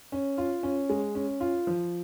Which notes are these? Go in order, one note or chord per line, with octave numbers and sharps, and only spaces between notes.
C#4
F4
C#4
G#3
C#4
F4
F3